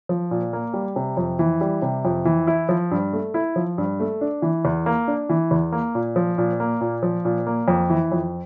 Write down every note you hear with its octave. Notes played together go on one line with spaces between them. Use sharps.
F3
A#2
A#3
G3
C3
F2
E3
G3
C3
F2
E3
E4
F3
G2
A3
E4
F3
G2
A3
D4
E3
E2
A#3
D4
E3
E2
A#3
A#2
F3
A#2
A#3
A#2
F3
A#2
A#3
F2
E3
F2